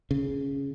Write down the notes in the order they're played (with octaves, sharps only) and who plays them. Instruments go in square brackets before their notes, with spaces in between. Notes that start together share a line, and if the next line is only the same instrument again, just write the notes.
[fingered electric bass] C#3